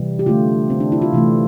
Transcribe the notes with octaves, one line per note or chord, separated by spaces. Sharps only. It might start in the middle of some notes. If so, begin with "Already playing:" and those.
Already playing: C3 E3 G3
G4
D3 A3 F4
C4
D4
E4
F4
C3 E3 A3